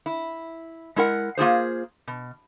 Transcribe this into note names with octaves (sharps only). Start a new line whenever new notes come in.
E4
G#3 E4 A#4 F#5
A#3 F4 G#4 C5
B2